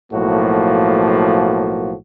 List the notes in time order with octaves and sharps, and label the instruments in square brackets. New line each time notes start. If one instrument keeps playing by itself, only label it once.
[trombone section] B1 A2 F3 A#3 F#4